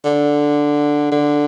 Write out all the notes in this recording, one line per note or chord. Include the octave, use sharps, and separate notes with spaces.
D3
D3